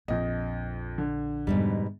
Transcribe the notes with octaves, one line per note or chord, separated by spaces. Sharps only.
A#1 F2 D#5
D3
F2 G#2 B2 G3